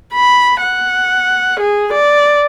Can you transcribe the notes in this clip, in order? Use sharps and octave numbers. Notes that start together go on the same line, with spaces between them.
B5
F#5
G#4
D5